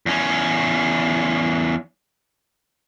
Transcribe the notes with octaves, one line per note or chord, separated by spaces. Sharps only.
E2 C#4